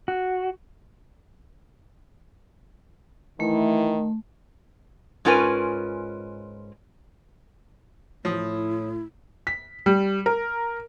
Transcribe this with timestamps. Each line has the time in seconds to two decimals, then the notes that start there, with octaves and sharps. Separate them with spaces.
0.08 F#4
3.40 D#3 E3 A3 E4
5.25 G#2 C#4 F4 A#4 B4 G#5
8.25 A2 F3 E4 C#5 D#6
9.47 B6
9.86 G3
10.26 A#4